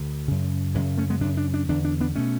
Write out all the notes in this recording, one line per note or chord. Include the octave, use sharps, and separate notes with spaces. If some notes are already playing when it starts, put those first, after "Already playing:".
Already playing: D2 D3
F#2 C#3
F#2 C#3 E3 G#3
A3 C#4
G#3 B3
F#2 C#3 D4
D4
D4
E2 D3 D4
D4
B3 D4
B2 A3 C#4